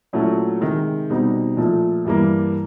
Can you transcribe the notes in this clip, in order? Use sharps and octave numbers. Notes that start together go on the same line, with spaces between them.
A#2 F#3 A3 C#4 E4
C3 D#3 G#3
B2 G3 C4 D#4
A#2 F3 A3
G2 E3 G3 A#3